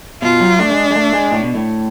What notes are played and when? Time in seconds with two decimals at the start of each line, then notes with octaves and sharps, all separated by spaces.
0.22 B2 F4
0.40 F#3
0.59 A3 D4
0.71 G#3
0.91 G#3
0.96 A3
1.13 G#3
1.32 A2
1.43 B2
1.55 A2